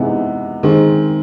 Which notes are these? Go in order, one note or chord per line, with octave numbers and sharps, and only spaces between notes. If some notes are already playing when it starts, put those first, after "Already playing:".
Already playing: C3 E3 G#3 B3 D#4
D#3 G#3 C4